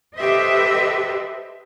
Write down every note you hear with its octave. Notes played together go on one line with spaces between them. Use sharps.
G4 A4 B4 C5 D#5 E5